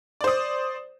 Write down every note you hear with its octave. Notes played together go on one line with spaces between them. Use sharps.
C5 D5 D#6